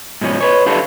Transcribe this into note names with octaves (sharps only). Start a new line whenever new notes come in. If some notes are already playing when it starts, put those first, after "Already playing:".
G#2 B2 F3 C#4
B4 C#5
D4 E4 F4 G4 A4